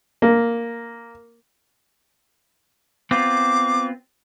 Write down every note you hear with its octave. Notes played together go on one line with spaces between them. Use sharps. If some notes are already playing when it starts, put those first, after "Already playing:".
A#3
B3 C4 F4 D6